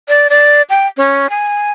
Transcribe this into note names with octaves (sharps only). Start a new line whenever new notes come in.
D5
D5
G5
C#4
G#5